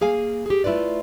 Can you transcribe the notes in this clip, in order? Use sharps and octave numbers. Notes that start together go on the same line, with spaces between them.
A#3 G#4 F5 G#5
G4 G#4
A3 E4 F4 B4 D5